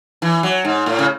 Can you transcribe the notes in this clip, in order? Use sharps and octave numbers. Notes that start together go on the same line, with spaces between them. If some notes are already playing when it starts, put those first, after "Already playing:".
E3
F#3
G#2
A2
C#3